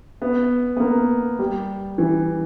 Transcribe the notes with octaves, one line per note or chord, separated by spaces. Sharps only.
B3
B3
A#3
G3
E3